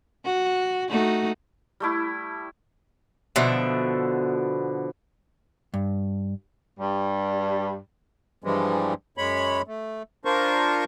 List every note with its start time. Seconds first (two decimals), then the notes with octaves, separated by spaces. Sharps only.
0.25 F#4
0.90 A3 D#4 F#4
1.80 G3 A3 E4
3.36 B2 D3 F3 E5
5.74 G2
6.79 G2 G3
8.44 G2 E3 F3 G3 G#3
9.18 F#2 G#3 C#5 B5
9.67 A3
10.25 D4 F4 A#4 C5 C#6